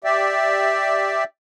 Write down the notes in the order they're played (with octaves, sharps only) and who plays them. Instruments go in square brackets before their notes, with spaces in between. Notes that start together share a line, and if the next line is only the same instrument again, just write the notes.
[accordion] G4 D5 E5